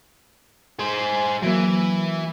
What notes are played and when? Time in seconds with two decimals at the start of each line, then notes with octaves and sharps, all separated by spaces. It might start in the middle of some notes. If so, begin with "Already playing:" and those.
0.79 G#4 C5
1.42 E3 F#3 A#3